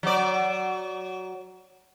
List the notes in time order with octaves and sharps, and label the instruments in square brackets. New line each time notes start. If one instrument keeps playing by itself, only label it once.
[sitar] F#3 D5